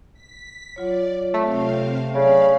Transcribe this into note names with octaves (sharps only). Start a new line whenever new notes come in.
B6
F#3 F4 C#5 D5
C3 A3 C4 F5
C#3 F#3 D5 F5 B5